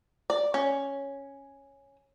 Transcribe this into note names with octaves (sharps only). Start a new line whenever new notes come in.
D5
C#4